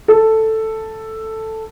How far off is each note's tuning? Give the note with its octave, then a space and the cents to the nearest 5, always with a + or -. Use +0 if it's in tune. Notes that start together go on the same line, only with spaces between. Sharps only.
A4 +5